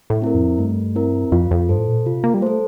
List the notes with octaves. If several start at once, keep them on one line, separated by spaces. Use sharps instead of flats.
A2
C4 E4 A#4
F2
G2 A3
C4 E4 A#4
F2 F4
F2
G2 A4 C5
A2
A#2
C3 F4
A#3
G3
A3 A4 C5